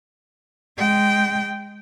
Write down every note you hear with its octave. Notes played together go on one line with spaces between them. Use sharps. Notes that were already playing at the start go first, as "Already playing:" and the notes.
G#3 G5